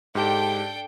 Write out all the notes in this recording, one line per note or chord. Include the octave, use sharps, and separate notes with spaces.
G#2 D4 G4 A4 G5 A5